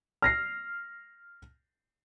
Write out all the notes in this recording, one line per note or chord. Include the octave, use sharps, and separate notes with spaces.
F6 A#6 C7